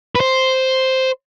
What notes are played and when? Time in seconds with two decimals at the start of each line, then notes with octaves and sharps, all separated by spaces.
0.15 B4
0.20 C5